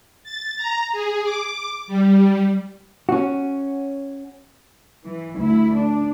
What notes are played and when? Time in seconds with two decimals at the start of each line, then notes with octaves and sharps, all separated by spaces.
0.24 A6
0.57 A#5
0.92 G#4
1.24 D6
1.87 G3
3.09 C#4 F#4
5.05 E3
5.38 D2 E4
5.75 D4